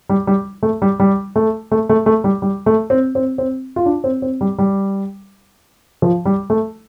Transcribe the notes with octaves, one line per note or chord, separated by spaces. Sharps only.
G3
G3
A3
G3
G3
A3
A3
A3
A3
G3
G3
A3
C4
C4
C4
F4
D4
C4
C4
G3
G3
F3
G3
A3